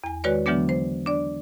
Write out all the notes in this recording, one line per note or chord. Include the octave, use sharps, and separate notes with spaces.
E2 G#5
D#3 G#3 F#4 B4 C#5 D5
D3 E3 F#3 G#3 B3 D4
C5
D4 D5